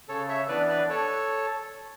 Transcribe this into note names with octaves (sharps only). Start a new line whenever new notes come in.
C#3 A4 C#5
C#5 E5
E3 B3 D4 B4 D5
B4 D5
A4 C#5